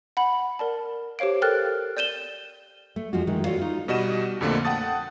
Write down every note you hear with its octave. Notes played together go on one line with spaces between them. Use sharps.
F#5 B5 F#7
A#4 D5 A5
G4 C5 C#5 F5 D7
A4 A#4 G5 F6 F#6 A6
D5 G6 D#7 E7 G7
A3
F2 F3 G#3 F4 F#4
D#3 E3 G#3
F4 F#4 A4 C#5 D5 F5
D#4 F4
B2 G3 F#4 D#5 D#7 E7
F2 A#2 D3 A3 A#3 C4
F#5 G5 A5 D#6 A6